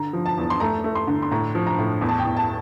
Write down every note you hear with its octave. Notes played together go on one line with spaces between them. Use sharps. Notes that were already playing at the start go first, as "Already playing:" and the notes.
Already playing: D3 A#5
F3
A5
E2
C6
A3 A#5
A3
C6
D3
C6
A2 A#5
F3
A#5
A2
E2
A5
G5
E2
A5